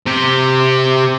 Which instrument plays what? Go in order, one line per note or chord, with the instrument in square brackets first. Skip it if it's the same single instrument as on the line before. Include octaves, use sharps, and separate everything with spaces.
[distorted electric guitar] C3 G4